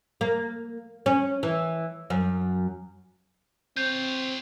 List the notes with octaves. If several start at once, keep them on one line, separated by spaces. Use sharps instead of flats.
A#3
C#4
E3
F#2
C4 F4 C#5 G6